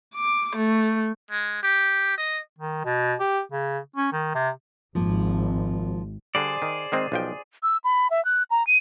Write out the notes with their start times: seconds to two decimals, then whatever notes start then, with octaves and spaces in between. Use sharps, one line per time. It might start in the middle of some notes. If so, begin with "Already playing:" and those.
0.15 D6
0.56 A3
1.31 G#3
1.63 G4
2.18 D#5
2.58 D#3
2.85 B2
3.20 G4
3.52 C#3
3.96 C#4
4.13 D#3
4.35 C3
4.95 G#1 F3 A#3
6.35 D3 G3 G#4 C5 D5
6.62 D#3
6.92 D#3 G#3 C4
7.12 B1 F3 G5
7.63 E6
7.84 B5
8.10 E5
8.25 F#6
8.51 A#5
8.67 D#7